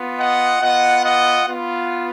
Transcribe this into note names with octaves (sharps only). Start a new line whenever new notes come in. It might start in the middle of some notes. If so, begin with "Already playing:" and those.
Already playing: B3 F4
D#5 F#5
B3 F4 D#5 F#5
D#5 F#5
B3 F4